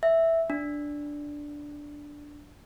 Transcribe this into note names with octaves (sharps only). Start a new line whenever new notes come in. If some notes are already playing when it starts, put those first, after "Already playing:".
E5
D4